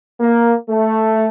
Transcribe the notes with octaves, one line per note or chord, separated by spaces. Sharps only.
A#3
A3